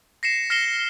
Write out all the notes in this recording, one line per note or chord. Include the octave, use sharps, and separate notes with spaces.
A#6 C7 C#7 E7
F6 A#6 C7 C#7 E7 G7